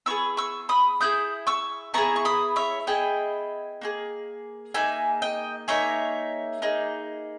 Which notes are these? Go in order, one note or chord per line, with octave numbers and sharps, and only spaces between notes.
B3 E4 G#4 C#6 E6
C#6 E6
B5 D#6
B3 E4 G#4 D#6 G6
C#6 E6
B3 E4 G#4 A#5 C#6
C#6
B5 D#6
C#5 E5
B3 E4 G#4 D#5 G5
A#3 D#4 G#4
A#3 D#4 G#4 E5 G#5
D#5 G5
A#3 D#4 G#4 C#5 E5
A#3 D#4 G#4